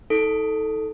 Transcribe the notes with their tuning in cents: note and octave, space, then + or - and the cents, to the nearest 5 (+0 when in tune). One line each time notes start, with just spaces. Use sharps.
D#4 +45 A4 +0